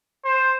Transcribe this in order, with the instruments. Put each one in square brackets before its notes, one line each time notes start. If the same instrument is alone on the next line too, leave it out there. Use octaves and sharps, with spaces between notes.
[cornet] C5